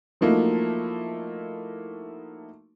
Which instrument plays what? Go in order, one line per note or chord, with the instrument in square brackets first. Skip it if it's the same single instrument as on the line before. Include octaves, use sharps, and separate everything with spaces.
[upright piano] F3 F#3 A3 A#3 D#4 E4